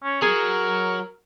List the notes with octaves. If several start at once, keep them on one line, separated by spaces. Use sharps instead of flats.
C#4
F#3 G#4 A#4